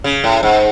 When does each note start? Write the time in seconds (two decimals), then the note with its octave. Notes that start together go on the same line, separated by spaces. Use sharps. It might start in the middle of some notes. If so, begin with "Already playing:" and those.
0.04 C#3
0.24 A2
0.43 G#2